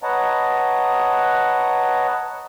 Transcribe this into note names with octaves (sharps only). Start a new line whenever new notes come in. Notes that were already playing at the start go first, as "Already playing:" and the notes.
B4 C#5 D#5 F#5 A5 A#5